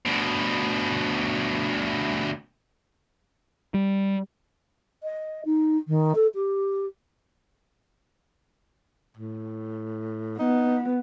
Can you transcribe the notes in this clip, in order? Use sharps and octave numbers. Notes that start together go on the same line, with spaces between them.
D2 B2
G3
D#5
D#4
D#3
A4
G4
A2
B3 D#4